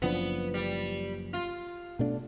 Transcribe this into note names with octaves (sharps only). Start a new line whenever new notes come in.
F#1 F3 B3 D4
G3
F4
B2 A3 D4